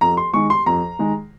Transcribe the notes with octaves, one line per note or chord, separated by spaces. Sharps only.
F2 A#5
C6
D#3 G#3 C#6
C6
F2 A#5
D#3 G#3